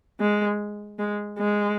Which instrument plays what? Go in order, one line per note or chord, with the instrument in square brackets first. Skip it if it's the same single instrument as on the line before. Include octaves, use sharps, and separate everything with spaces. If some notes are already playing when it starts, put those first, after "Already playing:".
[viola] G#3
G#3
G#3